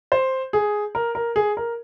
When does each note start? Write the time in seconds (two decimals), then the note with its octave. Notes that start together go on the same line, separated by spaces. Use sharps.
0.12 C5
0.53 G#4
0.95 A#4
1.15 A#4
1.36 G#4
1.57 A#4